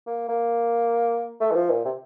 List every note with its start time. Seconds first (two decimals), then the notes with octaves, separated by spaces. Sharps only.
0.07 A#3
0.29 A#3
1.40 A3
1.51 E3
1.55 F3
1.70 A#2
1.85 C3